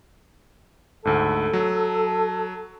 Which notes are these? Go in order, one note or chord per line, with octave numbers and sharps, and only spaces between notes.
D2 G#2 A4
F#3